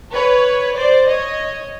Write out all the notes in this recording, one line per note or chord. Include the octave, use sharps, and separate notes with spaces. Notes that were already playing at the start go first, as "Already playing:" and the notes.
B4 C#5
C5 D5
C#5 D#5